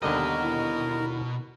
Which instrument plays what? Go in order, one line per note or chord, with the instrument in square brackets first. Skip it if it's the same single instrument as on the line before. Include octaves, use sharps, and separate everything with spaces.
[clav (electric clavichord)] D#2 D3 G3 [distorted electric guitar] B2 D#5 [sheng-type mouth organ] A#4
[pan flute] E4